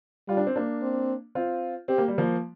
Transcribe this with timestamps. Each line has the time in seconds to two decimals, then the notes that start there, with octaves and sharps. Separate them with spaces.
0.28 G3 F4
0.37 D4
0.47 C4
0.56 A#3 D4
0.82 C4
1.35 C4 F4
1.88 C4 G4
1.98 A#3
2.08 G3
2.18 F3 A#3